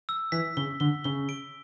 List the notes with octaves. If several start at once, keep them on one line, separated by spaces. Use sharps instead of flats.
E6
E3 B6
C#3 G7
D3 G7
C#3 G7
D7